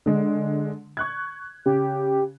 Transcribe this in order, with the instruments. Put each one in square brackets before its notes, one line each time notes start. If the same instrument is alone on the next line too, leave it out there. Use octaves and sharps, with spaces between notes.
[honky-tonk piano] D3 G#3
C#6 F#6 G#6
[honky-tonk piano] C#3 [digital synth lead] G4